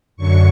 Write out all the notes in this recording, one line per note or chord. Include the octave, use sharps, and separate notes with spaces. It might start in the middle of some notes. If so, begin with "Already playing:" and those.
F#2 D3 F#3 C#6